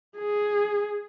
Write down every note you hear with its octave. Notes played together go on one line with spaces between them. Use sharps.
G#4